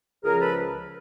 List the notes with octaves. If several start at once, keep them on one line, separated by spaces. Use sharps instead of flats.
C#2 C#3 F3 G#4 A#4
A4 B4